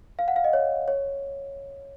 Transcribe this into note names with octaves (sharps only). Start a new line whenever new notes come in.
F5
F#5
F5
D#5
C#5
C#5